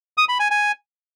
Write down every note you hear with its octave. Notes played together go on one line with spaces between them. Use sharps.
D#6
B5
G#5
G#5